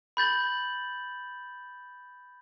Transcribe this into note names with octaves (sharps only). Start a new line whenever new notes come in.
B5 G6 A6 F#7